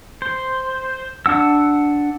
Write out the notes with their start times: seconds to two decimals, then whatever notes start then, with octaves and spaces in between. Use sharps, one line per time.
0.22 C5
1.26 D4 F#5 E6